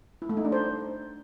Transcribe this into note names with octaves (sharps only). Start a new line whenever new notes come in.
E4
A3
D#4
D4
C5